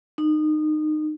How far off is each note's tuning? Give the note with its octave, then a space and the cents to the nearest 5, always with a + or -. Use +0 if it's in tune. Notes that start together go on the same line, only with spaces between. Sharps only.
D#4 -25